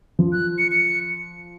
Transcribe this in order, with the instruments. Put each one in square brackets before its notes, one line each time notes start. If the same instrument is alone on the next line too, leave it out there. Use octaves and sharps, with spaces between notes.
[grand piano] F3
[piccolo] F#6
C#7
C#7